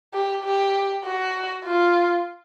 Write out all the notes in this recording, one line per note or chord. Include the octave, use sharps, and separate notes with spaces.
G4
G4
F#4
F4